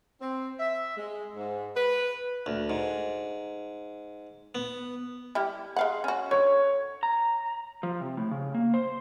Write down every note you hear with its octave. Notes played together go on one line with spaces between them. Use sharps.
C4
E5
G#3
G#2
B4
D2
G#2
B3
G3 E4 G4
G#3 F5 F#5
C#4 F#4
D3 C#5
A#5
F3
C3
A2
C#3
A#3
C5